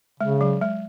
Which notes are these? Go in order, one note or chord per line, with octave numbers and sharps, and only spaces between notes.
C#3 G#3
F#3
G#3